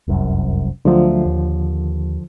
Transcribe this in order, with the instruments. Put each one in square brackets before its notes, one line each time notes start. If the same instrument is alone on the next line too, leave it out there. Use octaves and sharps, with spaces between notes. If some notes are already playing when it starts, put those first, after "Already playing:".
[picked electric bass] F1 C2 F#2
[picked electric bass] D2 F#3 A3 [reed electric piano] D3 F3
[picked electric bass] D#2